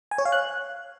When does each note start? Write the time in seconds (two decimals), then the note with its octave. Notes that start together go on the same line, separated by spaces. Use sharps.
0.11 G#5
0.18 C#5
0.25 F5
0.32 F#6